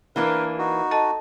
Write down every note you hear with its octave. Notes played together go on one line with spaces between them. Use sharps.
E3 A#3 D4 A#4 B4
D#4 F#4
A4 D#5 A5